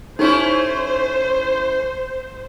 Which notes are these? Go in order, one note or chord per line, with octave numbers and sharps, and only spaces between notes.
A3 C#4 D#4 E4 G4 C5 C#5